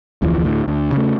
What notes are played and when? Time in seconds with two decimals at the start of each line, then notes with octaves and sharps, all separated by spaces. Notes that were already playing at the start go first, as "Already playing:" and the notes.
0.22 F1 D2 E3 F3
0.44 D2 A2
0.68 D2
0.92 C#3 A3